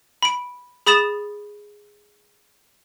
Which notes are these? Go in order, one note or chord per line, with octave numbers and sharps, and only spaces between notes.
B5 D7
G#4 B5 D#6 A6 E7